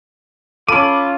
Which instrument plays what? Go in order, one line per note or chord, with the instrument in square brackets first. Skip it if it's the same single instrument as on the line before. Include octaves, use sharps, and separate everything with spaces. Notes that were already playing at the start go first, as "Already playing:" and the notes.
[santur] C#4 A4 [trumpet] F4 [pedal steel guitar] B5 D6 [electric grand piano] D#7